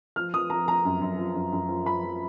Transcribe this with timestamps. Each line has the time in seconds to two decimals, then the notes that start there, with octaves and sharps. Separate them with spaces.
0.16 F3 F6
0.33 F3 D#6
0.50 F3 A#5
0.68 F3 A#5
0.85 F#2
1.02 F#2
1.18 F3
1.35 F#2
1.52 F#2
1.68 F3
1.85 F3 B5
2.03 F3